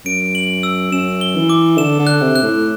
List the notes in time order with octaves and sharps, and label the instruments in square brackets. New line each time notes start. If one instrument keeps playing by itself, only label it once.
[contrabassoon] F#2 [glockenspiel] D7
[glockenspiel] F#7
E6
[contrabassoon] F#2 [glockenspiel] E7
[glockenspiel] G7
[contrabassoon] E3
[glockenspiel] D6
[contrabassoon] D3 [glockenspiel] E7
[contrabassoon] D3
[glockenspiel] F#6
[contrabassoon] C3
[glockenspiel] F#6
[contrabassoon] A2